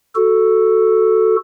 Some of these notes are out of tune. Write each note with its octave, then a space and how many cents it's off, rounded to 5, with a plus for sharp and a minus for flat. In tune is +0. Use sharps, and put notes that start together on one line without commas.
F#4 +0 A4 +0